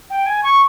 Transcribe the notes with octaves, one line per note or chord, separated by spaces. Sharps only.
G5
G#5
C#6